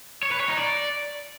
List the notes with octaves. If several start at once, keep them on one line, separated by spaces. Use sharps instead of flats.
C#5
B4
C#5
D#4
D5